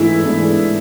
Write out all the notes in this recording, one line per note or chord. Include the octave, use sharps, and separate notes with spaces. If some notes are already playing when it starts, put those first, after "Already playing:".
Already playing: G#2 E3 A3 D4 E4 G#4
G#2 E3 A3 D4 G#4